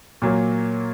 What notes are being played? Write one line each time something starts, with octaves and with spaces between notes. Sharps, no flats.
A#2 F#3 A#3